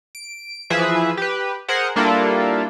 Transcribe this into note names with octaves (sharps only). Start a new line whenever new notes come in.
D7
E3 F3 G#4 B4 E5
G4 B4
G#4 A#4 C5 F#5
G3 A#3 D4 E4 F4 A4